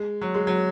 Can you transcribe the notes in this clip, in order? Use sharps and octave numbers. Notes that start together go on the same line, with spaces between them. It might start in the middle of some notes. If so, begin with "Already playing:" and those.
Already playing: G#3
F#3
G#3
F#3